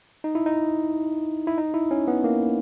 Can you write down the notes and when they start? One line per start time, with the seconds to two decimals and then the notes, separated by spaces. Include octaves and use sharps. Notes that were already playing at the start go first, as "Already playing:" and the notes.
0.24 D#4
0.35 E4
0.46 D#4
1.47 E4
1.58 D#4
1.74 E4
1.91 C#4
2.08 B3
2.24 A#3